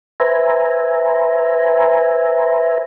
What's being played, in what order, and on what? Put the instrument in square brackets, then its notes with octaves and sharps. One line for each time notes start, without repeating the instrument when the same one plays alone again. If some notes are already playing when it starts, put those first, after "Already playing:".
[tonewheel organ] B4 C5 E5 G#5 A#5